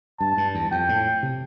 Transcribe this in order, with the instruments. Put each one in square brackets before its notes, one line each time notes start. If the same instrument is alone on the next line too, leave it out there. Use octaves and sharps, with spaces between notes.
[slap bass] G2 [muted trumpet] A5
[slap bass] G2
E2
[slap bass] F2 [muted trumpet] G5
[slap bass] A2
C3